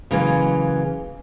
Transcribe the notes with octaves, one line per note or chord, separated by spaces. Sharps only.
C#3 E3 F#3 G#3 A#3